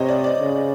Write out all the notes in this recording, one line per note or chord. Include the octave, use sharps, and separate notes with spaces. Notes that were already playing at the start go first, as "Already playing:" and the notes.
Already playing: C3 C5 C#5 D#5
D5
D5
C#3